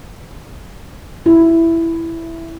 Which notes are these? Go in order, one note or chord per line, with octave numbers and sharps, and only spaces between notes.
E4